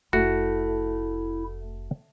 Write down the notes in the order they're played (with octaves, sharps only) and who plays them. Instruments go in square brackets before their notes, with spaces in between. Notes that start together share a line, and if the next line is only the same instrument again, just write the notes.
[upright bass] F1 [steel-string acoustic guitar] A3 [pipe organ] E4 [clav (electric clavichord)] F#4